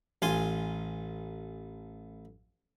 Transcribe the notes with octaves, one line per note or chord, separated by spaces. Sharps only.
A1 F4 G#5 C6